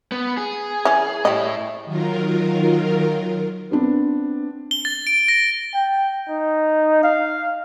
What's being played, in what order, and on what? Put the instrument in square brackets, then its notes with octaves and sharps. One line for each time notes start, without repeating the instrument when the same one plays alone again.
[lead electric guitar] B3
G#4
[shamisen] E3 C#4
[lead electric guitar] A2 E4 [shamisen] G3 D#5
[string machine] D#3 F#3 F4 A#4
[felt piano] B3 C4 D4 B4
[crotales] G7
A6
D7
A#6
[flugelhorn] G5
D#4
F5